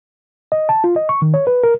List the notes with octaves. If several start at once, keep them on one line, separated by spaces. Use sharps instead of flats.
D#5
A5
F4
D#5
C#6
D#3
C#5
B4
A#4